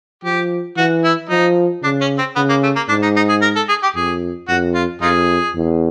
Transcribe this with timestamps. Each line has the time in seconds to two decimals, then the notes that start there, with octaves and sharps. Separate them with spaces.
0.23 F3 G4
0.77 E3 F#4
1.04 E4
1.29 F3 D#4
1.82 C#3 D4
2.01 C#4
2.18 C4
2.36 C#3 B3
2.49 A#3
2.63 A3
2.76 A#3
2.89 G#2 D4
3.02 D#4
3.16 D#4
3.29 G#4
3.42 A#4
3.56 A4
3.69 G#4
3.83 G4
3.95 F2 G#4
4.48 F2 F#4
4.75 F4
5.01 F2 D#4 F4 G#4
5.55 E2